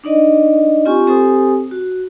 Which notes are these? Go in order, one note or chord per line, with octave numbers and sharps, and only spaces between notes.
D4 D#4 D5 D#5
C4 F4 G4 G#5 C#6
C4 G4 A4 C5 G#5 D#6
F#4